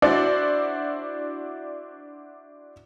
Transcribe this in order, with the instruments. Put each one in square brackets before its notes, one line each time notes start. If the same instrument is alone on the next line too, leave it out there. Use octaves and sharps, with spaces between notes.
[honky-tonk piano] D4 E4 F#4 C5 D5